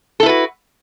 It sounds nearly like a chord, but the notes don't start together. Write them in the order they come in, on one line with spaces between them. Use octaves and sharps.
A4 E4 B4 F#4